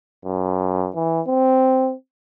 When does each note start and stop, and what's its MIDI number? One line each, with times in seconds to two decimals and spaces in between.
0.25 0.90 42
0.95 1.21 52
1.27 1.94 60